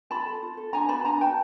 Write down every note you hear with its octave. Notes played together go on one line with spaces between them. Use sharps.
F4 A5 B5
A4
F4
A4
D4 G#5 A#5
F#4 B4 A5 B5
D4 G#5 A#5
F#4 B4 G5 A5